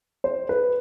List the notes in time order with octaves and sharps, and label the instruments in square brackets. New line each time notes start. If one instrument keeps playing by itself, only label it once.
[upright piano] C5
B4